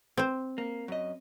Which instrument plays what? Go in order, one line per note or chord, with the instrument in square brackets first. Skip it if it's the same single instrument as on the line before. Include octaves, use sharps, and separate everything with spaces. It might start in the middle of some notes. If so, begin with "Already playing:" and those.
[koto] C4 C5
[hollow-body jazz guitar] A#3
F#2 D#5